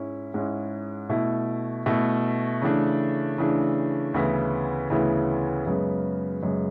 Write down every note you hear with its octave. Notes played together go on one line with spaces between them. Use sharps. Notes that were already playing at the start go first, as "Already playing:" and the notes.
Already playing: G#2 G#3 C#4 E4
G#2 G#3 C#4 E4
B2 A3 E4
B2 A3 E4
C#3 E3 A3 D4
C#3 E3 A3 D4
D2 C#3 E3 B3 E4
D2 C#3 E3 B3 E4
F#2 C#3 G#3 B3
F#2 C#3 G#3 B3